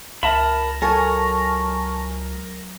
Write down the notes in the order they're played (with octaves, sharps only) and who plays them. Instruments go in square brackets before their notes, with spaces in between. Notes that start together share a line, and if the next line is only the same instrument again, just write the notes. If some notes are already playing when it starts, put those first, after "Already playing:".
[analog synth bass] C#2 [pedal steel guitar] A#4 A5 B5 [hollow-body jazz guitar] E5
[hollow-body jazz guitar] F#3 A4 [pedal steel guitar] A#4 [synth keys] G#5 A5 C#6